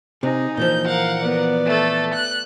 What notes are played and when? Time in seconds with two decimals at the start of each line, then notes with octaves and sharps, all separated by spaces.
0.23 C3 D#4 G#4
0.57 A#2 E3 F3 G6
0.87 A#4 F5 F#5
1.21 B3 D5
1.66 A3 A4
2.14 F#6